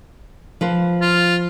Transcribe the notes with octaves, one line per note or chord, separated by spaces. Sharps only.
F3 B4 C5
F4